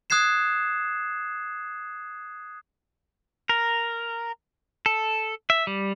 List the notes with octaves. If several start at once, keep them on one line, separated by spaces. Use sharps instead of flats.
D#6 F#6 G#6 C7 E7
A#4
A4
E5
G3